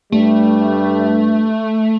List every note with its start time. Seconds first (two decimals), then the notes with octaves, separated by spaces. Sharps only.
0.12 G2 G3 A3